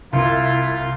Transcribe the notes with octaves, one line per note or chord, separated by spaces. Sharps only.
C2 E4 F4